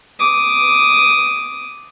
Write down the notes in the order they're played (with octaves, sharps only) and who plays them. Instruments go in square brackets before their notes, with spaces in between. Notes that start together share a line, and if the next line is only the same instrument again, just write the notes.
[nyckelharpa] D6 D#6